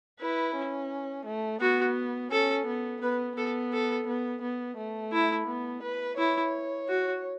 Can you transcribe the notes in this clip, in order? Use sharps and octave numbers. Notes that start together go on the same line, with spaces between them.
E4 B4
C#4
A3
B3 F#4
C#4 A4
B3
B3 B4
B3 A4
A4
B3
B3
A3
E4
B3
B4
E4 C#5
F#4